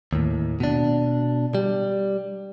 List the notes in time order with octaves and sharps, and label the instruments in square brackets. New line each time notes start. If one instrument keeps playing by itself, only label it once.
[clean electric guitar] D#2 A2
B2 D4
G3